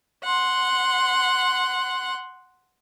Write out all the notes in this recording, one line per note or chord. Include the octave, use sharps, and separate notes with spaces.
F#5 C6